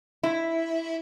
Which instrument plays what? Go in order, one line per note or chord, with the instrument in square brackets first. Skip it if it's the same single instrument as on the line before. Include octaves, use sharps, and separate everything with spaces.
[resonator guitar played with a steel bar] E4